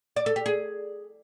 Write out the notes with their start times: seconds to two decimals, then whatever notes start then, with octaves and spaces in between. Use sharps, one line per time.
0.16 D5
0.26 A4
0.36 G4
0.46 G#4